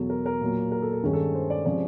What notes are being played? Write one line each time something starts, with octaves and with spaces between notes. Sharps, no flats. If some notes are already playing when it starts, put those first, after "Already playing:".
Already playing: E2 B2 F#3 A4
A#4
A#4
A#2 F#3 A#3
A#4
A4
A4
G2 D#3 G#3 C#4 G#4
A4
C5
D5
C3 F3 G#3 C#4 D5